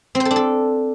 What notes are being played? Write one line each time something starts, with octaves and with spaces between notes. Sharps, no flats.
C4
C5
A4
D4
A4